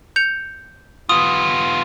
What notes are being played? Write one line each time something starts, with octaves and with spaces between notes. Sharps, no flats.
G6 C#7 F7
B3 F4 D#6